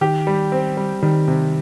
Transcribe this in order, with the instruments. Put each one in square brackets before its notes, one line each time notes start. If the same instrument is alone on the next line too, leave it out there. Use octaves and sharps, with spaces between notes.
[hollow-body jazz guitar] D#3 [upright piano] G4
[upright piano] G3
C4
G3
[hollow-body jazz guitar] D#3 [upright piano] G3
[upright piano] C3